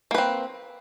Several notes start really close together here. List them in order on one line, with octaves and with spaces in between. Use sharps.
A#3 B4 C4